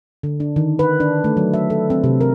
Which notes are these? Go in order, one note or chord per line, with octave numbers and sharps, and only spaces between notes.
D3
D4
D#3
B4
D4
A3
F#3
E5
A4
C4
C3
A#4